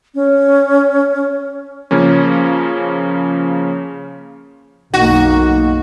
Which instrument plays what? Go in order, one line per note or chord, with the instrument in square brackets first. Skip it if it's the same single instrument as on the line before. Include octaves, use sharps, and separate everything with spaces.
[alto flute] C#4
[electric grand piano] C#3 F3 A#3 C#4
[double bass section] B1 F#2 A#3 [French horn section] D#4 [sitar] F#4